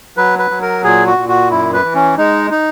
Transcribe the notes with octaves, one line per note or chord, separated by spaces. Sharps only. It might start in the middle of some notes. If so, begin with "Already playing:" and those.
F#3 B4
B4
F#3
A#4
A#2 G#4
F#4
A#2
F#4
F#2 E4
B4
E3
C#4
G#3 D#4
D#4